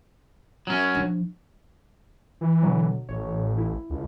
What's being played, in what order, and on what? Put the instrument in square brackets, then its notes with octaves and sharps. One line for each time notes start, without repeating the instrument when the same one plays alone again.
[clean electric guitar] F#3 C#4
[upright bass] F3 D4
[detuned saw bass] E3
[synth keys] B2 D3 F#3
[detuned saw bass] A1 [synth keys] C#5
[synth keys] E4
[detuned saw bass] C#2